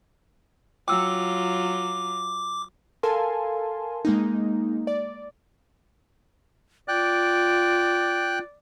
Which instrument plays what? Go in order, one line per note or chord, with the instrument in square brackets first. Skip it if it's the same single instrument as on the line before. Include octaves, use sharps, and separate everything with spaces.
[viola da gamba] F#3 F4 [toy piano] G5 E6 [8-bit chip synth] D6
[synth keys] A4 A#4 F5 G#5 A5 C6
G#3 A#3 D#4
D5
[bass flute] F4 [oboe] D5 [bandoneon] G5 F#6